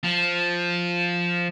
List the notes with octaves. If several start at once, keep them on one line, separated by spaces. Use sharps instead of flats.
F3